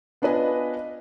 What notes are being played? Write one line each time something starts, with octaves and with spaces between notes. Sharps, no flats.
B3 D4 F4 B4 D#5 G#5